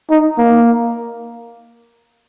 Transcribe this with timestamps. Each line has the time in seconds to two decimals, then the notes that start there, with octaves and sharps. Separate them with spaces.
0.10 D#4
0.38 A#3